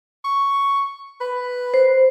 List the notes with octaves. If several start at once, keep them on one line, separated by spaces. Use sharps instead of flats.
C#6
B4
C5